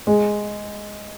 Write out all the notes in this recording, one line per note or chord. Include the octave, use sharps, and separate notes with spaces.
G#3